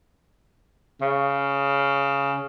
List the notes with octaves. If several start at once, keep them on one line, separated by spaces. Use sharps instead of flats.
C#3